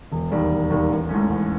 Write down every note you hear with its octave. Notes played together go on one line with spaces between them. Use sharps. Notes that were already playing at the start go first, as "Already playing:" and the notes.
E1
D#2 D#3 G3
E1
D#2 D#3 G3
A1
G#2 E3 A3 C#4
A1